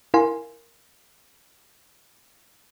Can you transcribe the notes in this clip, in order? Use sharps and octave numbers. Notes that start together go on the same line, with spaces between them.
E4 A#4 F5 G#5 C6